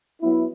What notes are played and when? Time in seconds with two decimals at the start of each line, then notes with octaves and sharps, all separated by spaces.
0.20 F#3 B3 E4